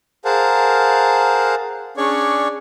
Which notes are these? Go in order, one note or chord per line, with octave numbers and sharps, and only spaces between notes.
G#4 A#4 C5 F5 F#5 A5
C#4 D4 G#4 C#5 D5 C#6